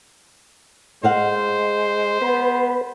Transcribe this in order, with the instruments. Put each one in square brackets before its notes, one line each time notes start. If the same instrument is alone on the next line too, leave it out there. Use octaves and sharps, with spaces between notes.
[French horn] G#3 [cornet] C5 [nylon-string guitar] D#5 F5 F#5
[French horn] B3 [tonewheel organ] B4